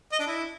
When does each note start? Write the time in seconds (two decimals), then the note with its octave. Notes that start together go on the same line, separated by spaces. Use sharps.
0.12 D#5
0.19 D4
0.27 E4